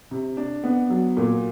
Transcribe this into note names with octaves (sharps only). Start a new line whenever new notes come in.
C3
D4
B3
F#3
A#2